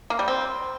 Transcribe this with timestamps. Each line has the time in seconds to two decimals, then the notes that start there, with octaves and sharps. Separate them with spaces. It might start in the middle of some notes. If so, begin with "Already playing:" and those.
0.10 A#3
0.19 G3
0.28 C4